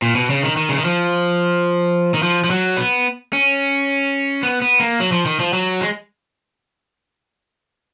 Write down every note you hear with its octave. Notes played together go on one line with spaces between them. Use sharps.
A#2
B2
C#3
D#3
D#3
C#3
D#3
F3
D#3
F3
F3
F#3
B3
C#4
B3
B3
A#3
F#3
F3
D#3
F3
F#3
G#3